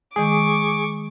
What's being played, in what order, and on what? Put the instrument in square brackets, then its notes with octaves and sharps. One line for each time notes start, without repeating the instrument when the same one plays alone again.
[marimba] D#3 G#3 [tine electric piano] G#4 [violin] C#6 D6